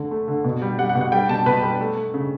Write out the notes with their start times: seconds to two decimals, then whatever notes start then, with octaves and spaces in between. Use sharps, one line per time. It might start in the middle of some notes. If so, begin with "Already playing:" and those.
Already playing: D3 A3
0.11 A3
0.28 D3
0.44 B2
0.62 G3
0.79 G3 F#5
0.89 F#5
0.95 B2
1.01 F#5
1.12 G3 G5
1.29 B2 A5
1.46 B2 B4
1.62 G3 B4
1.80 A3
1.96 A3
2.14 C#3